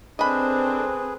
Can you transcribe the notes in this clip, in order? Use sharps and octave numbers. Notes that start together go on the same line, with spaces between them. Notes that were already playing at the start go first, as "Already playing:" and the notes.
C4 D4 G#4 A4 B4 D#5 B5